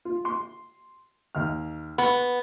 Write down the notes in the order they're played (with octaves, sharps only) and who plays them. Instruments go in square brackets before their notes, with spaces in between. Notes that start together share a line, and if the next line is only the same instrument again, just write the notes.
[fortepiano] F4
C6
D#2 F6
[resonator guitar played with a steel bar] B3 [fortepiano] B5